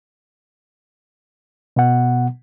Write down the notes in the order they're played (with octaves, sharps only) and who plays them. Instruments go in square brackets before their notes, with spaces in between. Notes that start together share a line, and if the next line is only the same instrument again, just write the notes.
[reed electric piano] B2 B3 F#5